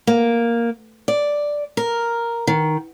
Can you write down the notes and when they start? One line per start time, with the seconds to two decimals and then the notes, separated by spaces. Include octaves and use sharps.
0.07 A#3
1.08 D5
1.77 A#4
2.47 D#3